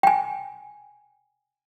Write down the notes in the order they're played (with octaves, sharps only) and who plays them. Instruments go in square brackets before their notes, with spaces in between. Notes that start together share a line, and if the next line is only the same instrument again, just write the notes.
[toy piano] G5 G#5